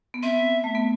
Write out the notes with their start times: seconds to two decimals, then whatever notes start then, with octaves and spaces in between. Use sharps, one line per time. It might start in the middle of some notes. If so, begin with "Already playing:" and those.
0.14 B3
0.23 C4 E5
0.64 A3
0.75 B3